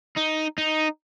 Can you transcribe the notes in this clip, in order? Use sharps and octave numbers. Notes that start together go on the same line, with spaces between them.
D#4
D#4